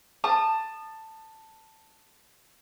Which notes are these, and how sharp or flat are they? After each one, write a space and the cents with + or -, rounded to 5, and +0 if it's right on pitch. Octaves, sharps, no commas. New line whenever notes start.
A5 +10 D#6 -30